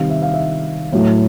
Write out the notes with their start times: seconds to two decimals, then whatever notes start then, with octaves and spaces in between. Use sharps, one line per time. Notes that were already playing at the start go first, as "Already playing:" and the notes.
Already playing: C3 D#3 G3 F5
0.10 E5
0.22 F5
0.34 E5
0.92 A2 F#3 A3